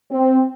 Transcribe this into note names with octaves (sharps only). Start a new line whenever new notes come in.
C4